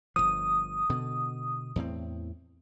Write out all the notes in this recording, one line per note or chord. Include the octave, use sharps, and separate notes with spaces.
G1 C2 F3 D#6
B2 D3
E2 A2 C4